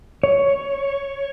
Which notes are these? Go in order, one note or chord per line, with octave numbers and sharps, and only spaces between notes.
C#5